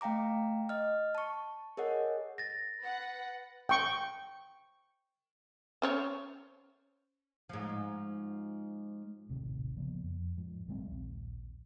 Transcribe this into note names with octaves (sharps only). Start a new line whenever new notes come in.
A3 F5 G5 A#5 D6
D#5 F6
A5 C#6
G#4 A#4 C#5 D#5 F#5
A6 A#6
B4 F#5
G5 C#6
C#4 C5 C#5
G#2 F3
D#1 A1 C3 D#3
C#3 F3 A#3 B3
F2
G#2 F3
A#1 F#3 G#3 C4
A#1 D#2